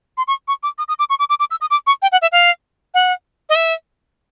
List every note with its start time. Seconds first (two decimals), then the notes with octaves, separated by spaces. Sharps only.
0.17 C6
0.28 C#6
0.48 C#6
0.63 D6
0.78 D#6
0.88 D#6
0.99 D6
1.10 C#6
1.19 D6
1.29 D6
1.40 D6
1.51 E6
1.61 D#6
1.71 D6
1.87 C#6
2.02 G5
2.12 F#5
2.22 E5
2.32 F5
2.94 F#5
3.49 D#5
3.55 E5